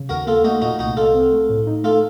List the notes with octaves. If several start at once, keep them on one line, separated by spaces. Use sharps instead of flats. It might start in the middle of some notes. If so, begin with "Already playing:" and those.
Already playing: C#3
D#2 F#4 A#4
A#3 F4 A4
A3 D#4 F#4
A#2 D#4 F#4
C2 D#4 F#4
C2 F4 A4
C4
A3
A2
D#4
A3 F4 A4